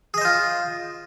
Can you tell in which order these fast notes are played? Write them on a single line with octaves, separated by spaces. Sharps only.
G#4 D#5 C5 F4